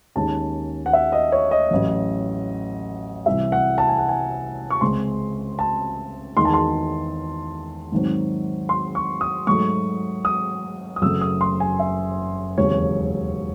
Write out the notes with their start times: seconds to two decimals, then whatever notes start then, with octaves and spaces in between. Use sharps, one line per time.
0.16 D#2 D#3 G#3 C#4 A5
0.86 F#5
0.93 E5
1.12 D#5
1.32 C#5
1.51 D#5
1.71 A1 A2 F#3
3.26 C2 C3 E3 E5
3.52 F#5
3.78 A5
3.89 G#5
3.98 F#5
4.09 G#5
4.70 C#6
4.81 C#2 C#3 G#3 C4 C6
5.59 A5
6.37 E2 D#3 G#3 C6
6.45 A5
6.54 C6
7.92 G#2 D#3 F#3 C4
8.69 C6
8.95 C#6
9.21 D#6
9.47 G#2 F#3 A3 C#6
10.25 D#6
10.96 D#6
11.02 F#1 F#2 C#3 F#3 A3 E6
11.21 D#6
11.41 C6
11.60 G#5
11.79 E5
12.57 E1 D#2 C#3 F#3 C4 C#5